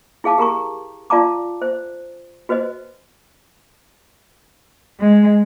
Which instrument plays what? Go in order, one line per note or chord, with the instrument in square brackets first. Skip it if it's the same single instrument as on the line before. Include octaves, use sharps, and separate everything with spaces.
[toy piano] E4 G#4 F5 A5 D6
G4 A#4 A#5 C#6
F4 D5 F5 A5 A#5 D6
C5
F#4 B4 C5 D#5
[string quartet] G#3